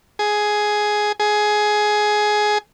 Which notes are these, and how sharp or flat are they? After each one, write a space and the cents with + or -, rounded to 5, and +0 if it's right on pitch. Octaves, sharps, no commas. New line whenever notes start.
G#4 +10
G#4 +15